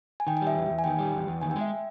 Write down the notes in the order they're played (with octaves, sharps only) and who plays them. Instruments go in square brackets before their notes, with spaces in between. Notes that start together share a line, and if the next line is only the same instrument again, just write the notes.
[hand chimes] G#5
[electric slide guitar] D#3 [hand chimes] G5
[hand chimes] G5
[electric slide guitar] G3
[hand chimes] E5
[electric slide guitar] E2
E2
[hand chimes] G#5
[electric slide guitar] D#3 [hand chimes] G5
[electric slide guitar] G3
E2
E2
[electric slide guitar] D#3 [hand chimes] G#5
[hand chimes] G5
[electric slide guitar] G#3
[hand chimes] E5